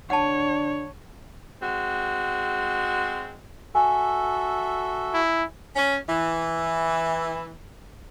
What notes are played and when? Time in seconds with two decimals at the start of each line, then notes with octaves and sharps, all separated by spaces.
0.10 D3 D4 C#5 F#5 A5
1.61 G#3 C4 F#4
3.75 F#4 A4 E5 G#5
5.14 E4
5.76 C#4
6.08 E3